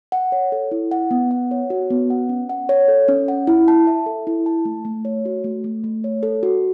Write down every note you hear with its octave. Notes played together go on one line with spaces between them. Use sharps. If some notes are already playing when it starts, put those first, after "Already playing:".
F#5
C#5
A4
E4
F#5
B3
F#5
C#5
F#4
B3
F#5
C#4
F#5
C#5
A4
C#4
F#5
E4
A5
E5
A4
E4
A5
A3
A3
C#5
F#4
A3
A3
A3
C#5
A4
F#4